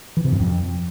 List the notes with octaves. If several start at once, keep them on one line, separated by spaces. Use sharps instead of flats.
E3
C3
F#2
F2